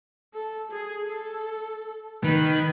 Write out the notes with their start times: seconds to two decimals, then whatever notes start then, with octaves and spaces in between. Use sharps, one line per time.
0.34 A4
0.72 G#4
1.09 A4
2.23 D#3 B4